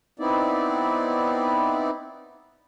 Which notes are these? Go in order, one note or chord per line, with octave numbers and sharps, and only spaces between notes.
B3 C4 D#4 E4 D5